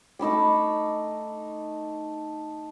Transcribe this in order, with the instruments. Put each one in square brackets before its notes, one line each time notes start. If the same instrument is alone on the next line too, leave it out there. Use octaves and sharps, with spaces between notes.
[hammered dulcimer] A3 D#4 B5 D6